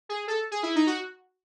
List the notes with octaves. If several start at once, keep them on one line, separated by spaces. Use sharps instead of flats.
G#4
A4
G#4
E4
D#4
F#4